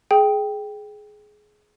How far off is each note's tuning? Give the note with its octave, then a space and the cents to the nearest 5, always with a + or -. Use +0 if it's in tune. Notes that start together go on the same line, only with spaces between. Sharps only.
G#4 +15 G5 +0